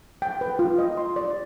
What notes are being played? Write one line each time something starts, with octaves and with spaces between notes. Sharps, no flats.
G5
B4
F4
D#5
C6
D5